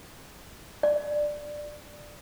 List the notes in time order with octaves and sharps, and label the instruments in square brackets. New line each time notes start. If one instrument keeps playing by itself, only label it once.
[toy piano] D5